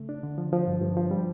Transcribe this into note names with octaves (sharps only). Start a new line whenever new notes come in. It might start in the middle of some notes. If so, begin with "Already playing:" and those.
Already playing: C#3 A3
D4
D3
F3
F3
G2
G2
F3
G3